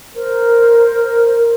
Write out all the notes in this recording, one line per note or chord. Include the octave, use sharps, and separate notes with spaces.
A#4 C5